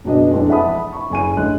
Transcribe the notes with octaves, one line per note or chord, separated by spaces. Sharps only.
F#1 B2 B3 D4 D#5
F2 E3 G#3 D4 D#4
E5 F#5 A5 B5 D#6
B5 C#6
F#1 G#5 D#7
A1 D3 G#3 F#6